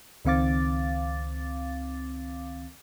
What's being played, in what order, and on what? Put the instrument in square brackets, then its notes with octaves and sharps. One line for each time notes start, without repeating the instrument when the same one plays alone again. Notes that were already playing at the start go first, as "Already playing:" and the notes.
[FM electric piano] C#2 D#3 C4 F5 D6 A6